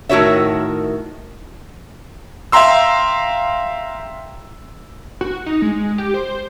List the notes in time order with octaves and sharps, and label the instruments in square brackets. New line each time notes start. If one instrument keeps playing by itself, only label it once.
[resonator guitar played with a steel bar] A2 D#3 F#4 A#4 C#5 E5
[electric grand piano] E5 F5 G5 A#5 C6 E6
[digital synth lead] F#4
D#4
G#3
G4
C5